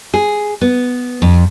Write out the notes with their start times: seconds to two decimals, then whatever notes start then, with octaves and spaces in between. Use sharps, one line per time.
0.14 G#4
0.61 B3
1.22 F2